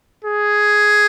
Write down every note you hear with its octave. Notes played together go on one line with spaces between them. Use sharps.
G#4